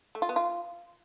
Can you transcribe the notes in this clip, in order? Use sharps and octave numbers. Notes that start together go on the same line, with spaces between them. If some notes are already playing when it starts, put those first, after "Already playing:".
A3
F4
B3
F4